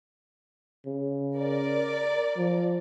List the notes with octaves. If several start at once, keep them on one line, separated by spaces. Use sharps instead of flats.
C#3
A#4 D5
F3